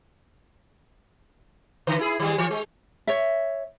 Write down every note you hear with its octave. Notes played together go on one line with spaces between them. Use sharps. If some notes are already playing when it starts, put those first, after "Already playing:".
D3 E3 B4
E4 G#4
D#3 G3 G#3
E3
G#3
C#5 E5